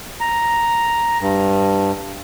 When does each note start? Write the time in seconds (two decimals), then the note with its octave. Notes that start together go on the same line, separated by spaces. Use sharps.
0.20 A#5
1.21 G2